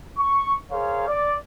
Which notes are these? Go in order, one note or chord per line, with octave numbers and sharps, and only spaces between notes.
C#6
G#4 A#4 C5 C#5 F5
D5